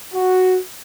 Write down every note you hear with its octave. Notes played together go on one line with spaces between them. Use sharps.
F#4